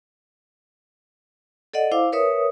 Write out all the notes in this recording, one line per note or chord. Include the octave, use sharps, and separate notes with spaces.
A4 D5 D#5 F#5
E4 C5 F5 D6
A#4 B4 C#5 E5 D#6